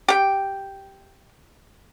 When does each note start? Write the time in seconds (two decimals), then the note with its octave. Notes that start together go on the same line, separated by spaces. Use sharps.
0.08 G4 G5